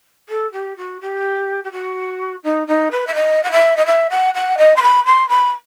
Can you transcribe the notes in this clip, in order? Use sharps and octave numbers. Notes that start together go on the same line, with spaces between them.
A4
G4
F#4
G4
G4
F#4
D#4
D#4
B4
E5
D#5
F#5
E5
D#5
E5
F#5
F#5
D#5
C6
B5
C6
B5